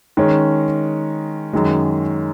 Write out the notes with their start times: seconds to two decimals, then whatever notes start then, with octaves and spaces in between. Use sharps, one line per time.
0.17 D#3 G#3 C#4
1.53 F#2 D#3 G#3